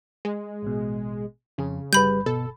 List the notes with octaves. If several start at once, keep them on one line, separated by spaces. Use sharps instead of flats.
G#3
A1 B2
F2 C#3 G#4
G1 G3 B4 B5 G6
B2 A4